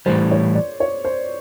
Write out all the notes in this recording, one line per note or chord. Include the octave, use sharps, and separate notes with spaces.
A2 E3 G3 C5
C#5
D5
C#5
C5